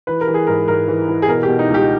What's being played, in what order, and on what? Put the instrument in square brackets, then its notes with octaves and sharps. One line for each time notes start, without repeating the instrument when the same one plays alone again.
[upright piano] E3 B4
A#4
E3
G#4
G#2 A#4
G#2 A#4
E3
E3
G#4
B2 A#4
G4
B2
D#4
C#2
G4